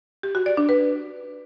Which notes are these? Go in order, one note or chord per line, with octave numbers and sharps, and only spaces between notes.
G4
F#4
D5
D4
B4